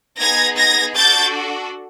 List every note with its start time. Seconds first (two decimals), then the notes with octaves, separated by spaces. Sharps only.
0.20 B3 D#4 G#4 G#6 A#6
0.58 G#6 A#6
0.96 D4 F#4 A4 G6 A6